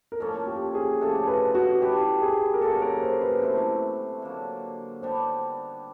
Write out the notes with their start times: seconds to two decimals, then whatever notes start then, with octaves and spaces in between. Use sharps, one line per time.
0.12 A#4
0.20 A#2 F3 A#3 C#4 A4
0.47 G4
0.75 G#4
1.01 C#3 F3 A3 D4 A4
1.27 B4
1.55 F#4
1.81 E3 G3 B3 D4 G4
2.22 G#4
2.54 A#4
2.61 F#3 A#3 C#4 F#4 A4
2.82 A#4
3.02 C5
3.21 B4
3.41 C3 E3 A3 C5
4.22 D3 F#3 A#3
5.02 G3 B3 D4 G4 C5